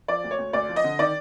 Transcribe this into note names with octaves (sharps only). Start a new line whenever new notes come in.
F3 D5
D2
C#5
D2
D2 D5
F3
D#5
D3
D#3 D5